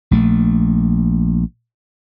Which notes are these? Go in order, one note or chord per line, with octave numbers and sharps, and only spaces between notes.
A#1 A3